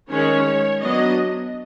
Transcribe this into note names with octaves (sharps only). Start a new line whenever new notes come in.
D#3 G#3 C#4 C#5
F#3 B3 D4 D#5